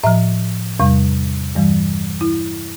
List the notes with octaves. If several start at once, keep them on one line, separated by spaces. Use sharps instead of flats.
A2 F3 E5
E2 C3 G3
G2 E3 G3
E4